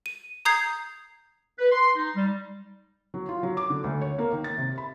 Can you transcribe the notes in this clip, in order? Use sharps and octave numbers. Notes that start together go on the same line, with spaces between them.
D#7
A#5 D#6 G6 G#6 C7
B4
C6
D#4
G3
F#3
F4
F#3
D6
D3
D2
C#5
A#3
D#3
A6
C3
B5